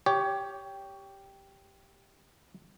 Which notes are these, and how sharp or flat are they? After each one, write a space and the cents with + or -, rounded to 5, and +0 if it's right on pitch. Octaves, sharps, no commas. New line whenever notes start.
G4 +0 C#5 +20